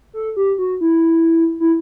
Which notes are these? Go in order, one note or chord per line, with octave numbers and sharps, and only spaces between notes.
A4
G4
F#4
E4
E4